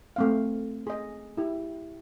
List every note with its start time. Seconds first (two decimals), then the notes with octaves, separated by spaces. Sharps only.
0.16 A3 C4 F5
0.87 G#4 D#5
1.37 E4 G4